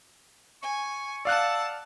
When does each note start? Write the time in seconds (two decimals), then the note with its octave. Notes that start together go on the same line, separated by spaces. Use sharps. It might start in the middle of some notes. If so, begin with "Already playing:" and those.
0.63 G#5 C#6
1.25 D5 F5 F#5 A5 E6 F#6